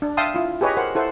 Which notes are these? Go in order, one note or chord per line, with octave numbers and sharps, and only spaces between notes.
D4
E5 F5 G5 A5 C6 D#6
E4 F4
G4 G#4 B4 C#5 D#5
A#4 C5 F#5
E4 A4 C5 F#5